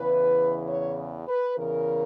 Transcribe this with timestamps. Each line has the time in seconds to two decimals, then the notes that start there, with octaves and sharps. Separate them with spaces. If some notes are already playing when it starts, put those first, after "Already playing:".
Already playing: E2 C#3 E3 B4
0.67 C#5
1.27 B4
1.57 E2 C#3 E3 A#4